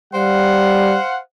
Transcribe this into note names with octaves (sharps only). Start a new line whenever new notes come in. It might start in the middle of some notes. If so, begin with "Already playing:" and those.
G3 C5 F5 F#5